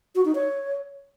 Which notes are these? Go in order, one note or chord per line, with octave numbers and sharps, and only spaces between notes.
F#4
D#4
C#5